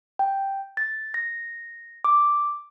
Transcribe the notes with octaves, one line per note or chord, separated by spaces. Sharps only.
G5
A6
A#6
D6